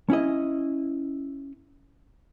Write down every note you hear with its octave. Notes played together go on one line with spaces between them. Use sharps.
C#4 E4 D#5